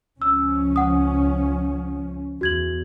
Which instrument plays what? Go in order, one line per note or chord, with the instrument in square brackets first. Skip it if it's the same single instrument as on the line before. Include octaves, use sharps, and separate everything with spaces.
[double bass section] C#2 F3 C#4 [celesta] E6
[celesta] F#5 D#6
[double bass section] E2 [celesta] F#4 G#6 F#7